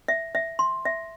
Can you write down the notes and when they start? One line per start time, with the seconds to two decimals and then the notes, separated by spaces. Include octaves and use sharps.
0.08 E5
0.35 E5
0.59 C6
0.85 E5